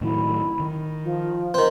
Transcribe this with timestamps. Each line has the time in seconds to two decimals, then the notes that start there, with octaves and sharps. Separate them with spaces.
0.01 A2 D#3 F#3 E4
0.60 D#3
1.03 F3
1.54 D#3 C4